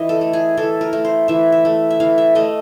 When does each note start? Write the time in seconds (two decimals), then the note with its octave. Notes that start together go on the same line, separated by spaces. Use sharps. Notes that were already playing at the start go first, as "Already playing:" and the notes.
Already playing: E3 D#5
0.09 A4
0.21 A3
0.33 G#4
0.57 E3 A4
0.81 A#4
0.93 A3
1.05 C5
1.28 E3 E5
1.52 E5
1.65 A3
1.90 E5
2.00 E3 F5
2.18 E5
2.35 A3 D#5